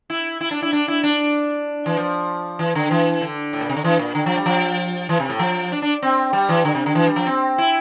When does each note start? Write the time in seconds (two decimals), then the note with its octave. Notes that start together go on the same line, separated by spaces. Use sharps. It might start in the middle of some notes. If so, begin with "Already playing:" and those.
0.10 E4
0.41 E4
0.51 D4
0.62 E4
0.73 D4
0.88 E4
1.03 D4
1.86 E3
1.97 F3
2.59 E3
2.75 D3
2.91 E3
3.21 D3
3.53 A2
3.61 A#2
3.69 C3
3.77 D3
3.84 E3
3.99 A#2
4.15 D3
4.26 F3
4.35 G3
4.46 F3
5.09 E3
5.20 C3
5.29 A2
5.39 F3
5.72 D4
5.82 D4
6.02 C4
6.33 G3
6.49 E3
6.65 D3
6.75 C3
6.86 D3
6.95 E3
7.07 G3
7.16 F3
7.26 C4
7.58 E4